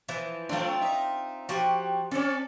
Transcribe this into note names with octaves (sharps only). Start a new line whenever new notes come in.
E3 F3
F3 A3 C4 D4 F4
D#4 E5
F3 F#4 G4
C4 C#4 A4 D5